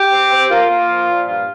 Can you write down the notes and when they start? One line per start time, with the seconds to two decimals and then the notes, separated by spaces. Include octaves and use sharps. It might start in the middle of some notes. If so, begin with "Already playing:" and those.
Already playing: G4
0.12 C4
0.31 C4
0.50 A#3 F4
0.69 A#3
0.88 F3
1.08 A#2
1.27 G2 F4